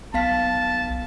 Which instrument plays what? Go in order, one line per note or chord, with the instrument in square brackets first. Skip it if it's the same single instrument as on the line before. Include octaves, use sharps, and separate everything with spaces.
[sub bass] B1 [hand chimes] B3 F5 B6 [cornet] A5